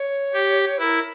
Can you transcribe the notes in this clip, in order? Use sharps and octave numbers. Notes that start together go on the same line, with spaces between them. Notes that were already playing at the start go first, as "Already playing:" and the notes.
Already playing: C#5
G4
E4 A#4 B4